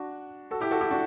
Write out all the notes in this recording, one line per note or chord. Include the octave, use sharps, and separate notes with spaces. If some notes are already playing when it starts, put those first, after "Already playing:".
Already playing: D4 F#4
F#4 A4
E4 G4
F#4 A4
E4 G4
D4 F#4